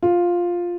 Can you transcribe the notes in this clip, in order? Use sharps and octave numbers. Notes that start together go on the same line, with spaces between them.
F4